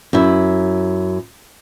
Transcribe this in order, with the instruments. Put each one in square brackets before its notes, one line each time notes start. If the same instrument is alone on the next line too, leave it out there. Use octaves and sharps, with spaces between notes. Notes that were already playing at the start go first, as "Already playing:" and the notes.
[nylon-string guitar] F#2 E4